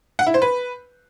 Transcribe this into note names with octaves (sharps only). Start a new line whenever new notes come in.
F#5
E4
C5
B4